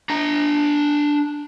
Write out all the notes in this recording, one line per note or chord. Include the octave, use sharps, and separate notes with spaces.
D4 A#5